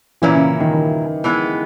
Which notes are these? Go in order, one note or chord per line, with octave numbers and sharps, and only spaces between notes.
A#2 E3 A#3 C#4 E4
C#3
C#3
D#3
D#3
E3 G#3 B3